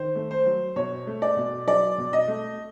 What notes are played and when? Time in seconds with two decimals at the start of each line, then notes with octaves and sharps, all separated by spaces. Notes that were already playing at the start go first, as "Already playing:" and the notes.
Already playing: D#3 C5
0.15 A3
0.31 C5
0.46 F#3
0.76 B2 C#5
1.07 A3
1.22 D5
1.37 B2
1.67 F#3 D5
1.98 B2
2.13 D#5
2.28 A3